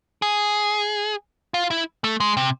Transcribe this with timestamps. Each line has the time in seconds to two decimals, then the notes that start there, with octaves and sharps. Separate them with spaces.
0.22 G#4
1.54 F4
1.71 E4
2.04 A3
2.20 G#3
2.37 C3